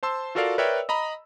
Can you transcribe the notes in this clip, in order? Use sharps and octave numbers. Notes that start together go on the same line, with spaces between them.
C5 A5 C6 E6
F4 F#4 A4 A#4 D5 F5
A#4 B4 C#5 D5 E5 G5
D#5 A#5 B5